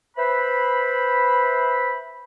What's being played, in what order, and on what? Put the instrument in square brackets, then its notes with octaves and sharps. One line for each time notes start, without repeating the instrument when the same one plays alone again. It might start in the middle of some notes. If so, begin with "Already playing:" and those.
[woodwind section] B4 C5 E5 B5